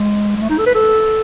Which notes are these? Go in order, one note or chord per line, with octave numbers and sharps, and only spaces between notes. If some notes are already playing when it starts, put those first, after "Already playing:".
Already playing: G#3
G#3
A3
D#4
A4
B4
A4